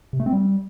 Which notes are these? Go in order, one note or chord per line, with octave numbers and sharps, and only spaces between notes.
C3
A3
C4
G3